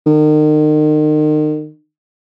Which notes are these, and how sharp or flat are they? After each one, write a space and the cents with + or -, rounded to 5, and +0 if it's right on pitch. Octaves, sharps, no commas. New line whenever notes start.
D#3 -35